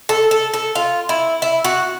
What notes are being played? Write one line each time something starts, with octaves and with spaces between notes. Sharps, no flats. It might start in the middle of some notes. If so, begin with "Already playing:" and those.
A4
A4
A4
F4
E4
E4
F#4